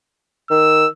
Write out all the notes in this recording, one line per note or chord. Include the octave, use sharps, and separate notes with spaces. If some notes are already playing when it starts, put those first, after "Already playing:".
D#3 E6